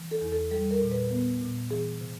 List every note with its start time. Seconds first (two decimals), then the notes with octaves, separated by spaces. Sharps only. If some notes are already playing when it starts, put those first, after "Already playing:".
Already playing: E3
0.11 A4
0.21 E2
0.32 A4
0.51 G3 A4
0.71 A#4
0.82 A#2
0.91 B4
1.11 B3
1.41 A#2
1.71 E3 G#4
2.01 C3